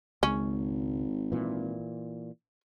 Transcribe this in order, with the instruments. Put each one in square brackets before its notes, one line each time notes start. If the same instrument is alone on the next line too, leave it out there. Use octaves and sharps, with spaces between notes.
[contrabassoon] G#1 [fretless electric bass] C#2 G#3 [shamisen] C#4
[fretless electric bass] A#2 E3